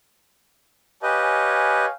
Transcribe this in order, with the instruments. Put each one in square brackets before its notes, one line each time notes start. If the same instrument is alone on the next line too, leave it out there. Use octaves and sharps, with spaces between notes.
[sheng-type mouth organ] G4 B4 D#5 [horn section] C#5 F5 G#5